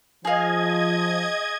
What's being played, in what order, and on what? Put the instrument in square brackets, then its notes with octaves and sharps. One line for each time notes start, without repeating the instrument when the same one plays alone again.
[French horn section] F3 [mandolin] G#4 F5 [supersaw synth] D#5 G#6